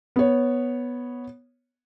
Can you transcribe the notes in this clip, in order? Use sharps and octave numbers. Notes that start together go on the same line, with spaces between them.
B3 C#5